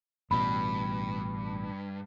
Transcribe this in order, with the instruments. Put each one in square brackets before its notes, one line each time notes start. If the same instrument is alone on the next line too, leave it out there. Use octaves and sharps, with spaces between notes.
[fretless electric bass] A1 B2 [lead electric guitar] G2 [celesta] B5